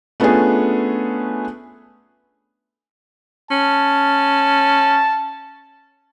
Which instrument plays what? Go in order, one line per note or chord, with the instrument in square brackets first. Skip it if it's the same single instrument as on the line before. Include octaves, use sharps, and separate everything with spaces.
[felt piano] A3 B3 C#4 D4 F4 G#4
[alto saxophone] C#4 [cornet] A5